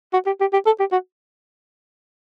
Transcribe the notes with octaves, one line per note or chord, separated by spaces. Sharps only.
F#4
G4
G4
G4
A4
G4
F#4